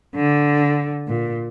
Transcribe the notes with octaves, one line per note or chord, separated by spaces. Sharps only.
D3
A#2